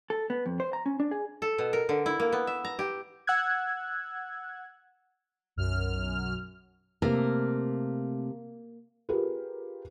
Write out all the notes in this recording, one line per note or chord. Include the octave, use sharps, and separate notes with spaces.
A4
B3
F2
C5
A#5
C#4
D4
G#4
A4
B2
A#4
D3
E4
A#3
B3
E5
A#5
G4
F#5 E6 F#6 G#6
B1 F#2 F6
C3 A3 A#3 A#4
F4 G4 G#4 A#4 B4